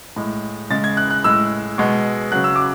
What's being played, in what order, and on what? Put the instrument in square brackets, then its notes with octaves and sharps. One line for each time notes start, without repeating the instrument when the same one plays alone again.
[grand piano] A2 G#3
C#3 G#3 A6
G#6
F#6
F#6
A2 G#3 E6
B2 G#3
C#3 F#3 F#6
E6
D6